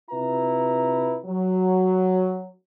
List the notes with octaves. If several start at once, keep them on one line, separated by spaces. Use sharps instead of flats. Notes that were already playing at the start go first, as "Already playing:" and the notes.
C3 E4 F4 B4 A#5
F#3